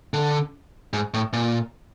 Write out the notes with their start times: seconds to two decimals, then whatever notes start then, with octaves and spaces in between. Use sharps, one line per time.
0.14 D3
0.93 G#2
1.14 A2
1.33 A#2